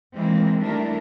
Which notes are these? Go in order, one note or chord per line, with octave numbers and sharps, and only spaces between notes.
D#3 E3 G#3 A#3 C4
D#3 G3 A3 D4 E4 A#4